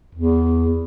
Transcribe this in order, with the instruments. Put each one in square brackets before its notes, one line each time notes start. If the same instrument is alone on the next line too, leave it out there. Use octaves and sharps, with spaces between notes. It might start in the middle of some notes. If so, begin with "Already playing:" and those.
[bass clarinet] E2